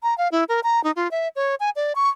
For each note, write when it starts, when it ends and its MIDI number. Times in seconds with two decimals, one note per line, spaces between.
0.03 0.16 82
0.18 0.28 77
0.32 0.44 64
0.49 0.60 70
0.63 0.82 82
0.84 0.91 63
0.96 1.10 65
1.11 1.28 76
1.36 1.55 73
1.60 1.70 80
1.76 1.93 74
1.95 2.09 85